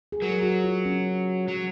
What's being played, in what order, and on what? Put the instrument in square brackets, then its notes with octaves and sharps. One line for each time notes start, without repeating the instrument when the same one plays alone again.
[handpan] G#4
[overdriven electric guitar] F#3 [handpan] A#4
[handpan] F#4
F4
C#4
[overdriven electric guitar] F#3